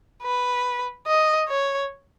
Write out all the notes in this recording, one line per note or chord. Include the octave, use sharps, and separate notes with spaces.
B4
D#5
C#5